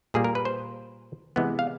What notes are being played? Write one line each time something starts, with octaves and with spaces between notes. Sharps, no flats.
A#2 G3 A#3 G#4
A#4
B4
C5
C3 E3 G#3 B3
F5